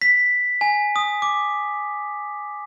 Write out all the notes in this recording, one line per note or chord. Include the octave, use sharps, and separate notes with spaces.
B6
G#5
D#6
D6